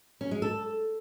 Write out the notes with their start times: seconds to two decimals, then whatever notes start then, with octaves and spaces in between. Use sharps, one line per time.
0.21 C#4
0.31 G#3
0.42 A4